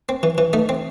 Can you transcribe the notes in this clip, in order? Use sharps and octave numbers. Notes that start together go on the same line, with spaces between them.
C4
E3
E3
A3 D#4
C4